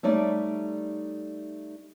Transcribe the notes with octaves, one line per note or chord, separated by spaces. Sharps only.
G3 A3 D#4 C#5 D5